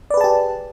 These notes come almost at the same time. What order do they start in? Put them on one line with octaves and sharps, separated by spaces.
D5 B4 G#4 A5 G4